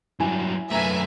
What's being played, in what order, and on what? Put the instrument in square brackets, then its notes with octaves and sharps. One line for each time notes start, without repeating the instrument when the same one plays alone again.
[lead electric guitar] G2 F#3 [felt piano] E4 G#5
[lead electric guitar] F#2 A3 [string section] B4 E5 G#5 [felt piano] A#5